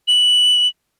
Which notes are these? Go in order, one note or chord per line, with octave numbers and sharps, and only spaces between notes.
F#7